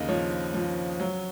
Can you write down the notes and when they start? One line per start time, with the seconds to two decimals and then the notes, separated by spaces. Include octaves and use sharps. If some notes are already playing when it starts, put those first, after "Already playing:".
Already playing: D#2 C#3 D#4 D#5
0.09 F3 C#5
0.54 F3
1.00 F#3